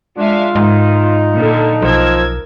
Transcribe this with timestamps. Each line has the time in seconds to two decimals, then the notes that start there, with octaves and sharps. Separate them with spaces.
0.18 G#3 D4 F4 E5 F5
0.55 G#2 D#3 D#4
1.34 A#2 D3
1.82 B1 F3 A#4 E6 G#6